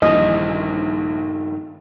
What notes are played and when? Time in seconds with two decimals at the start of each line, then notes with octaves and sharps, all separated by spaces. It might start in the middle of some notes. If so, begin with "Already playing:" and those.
0.02 A#1 G2 D#3 E3 D#5